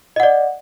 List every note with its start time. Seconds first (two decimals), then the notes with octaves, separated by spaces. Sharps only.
0.16 D#5
0.20 F#5
0.23 D5